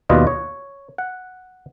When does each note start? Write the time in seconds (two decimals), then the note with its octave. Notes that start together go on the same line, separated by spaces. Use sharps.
0.09 D#2 B2 F4 B4 D5 D#5
0.27 C#5
0.98 F#5